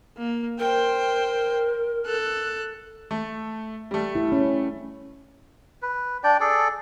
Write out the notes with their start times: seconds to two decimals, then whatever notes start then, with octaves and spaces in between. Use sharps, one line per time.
0.17 A#3
0.59 A#4 C5 G5
2.06 A4 F#6
3.11 A3
3.91 G3 A3
4.15 E4
4.32 C#4
5.82 B4
6.24 D4 D5 G5
6.40 G#4 A4 D5